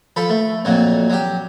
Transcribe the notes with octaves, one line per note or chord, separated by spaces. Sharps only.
F3 A4 B5
A3
F2 A#2 F#3
F#3 G4